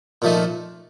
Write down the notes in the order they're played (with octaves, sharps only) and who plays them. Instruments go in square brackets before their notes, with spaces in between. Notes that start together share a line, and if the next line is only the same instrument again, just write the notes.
[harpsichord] A#2 F3 A3 D#4